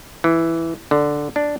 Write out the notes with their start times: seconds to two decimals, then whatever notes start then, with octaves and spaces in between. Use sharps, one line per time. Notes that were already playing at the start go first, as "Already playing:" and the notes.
0.24 E3
0.91 D3
1.36 D4